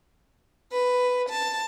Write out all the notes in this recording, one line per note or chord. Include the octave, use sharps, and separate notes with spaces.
B4
A5